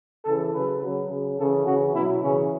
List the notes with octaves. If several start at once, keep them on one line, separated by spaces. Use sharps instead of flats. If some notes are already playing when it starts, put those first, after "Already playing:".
C#3 E3 A4
C#3 F#3 B4
C#3 F#3
C#3 F#3
C#3 E3 A4
C#3 E3 F#4
B2 F#3 E4
C#3 E3 C#4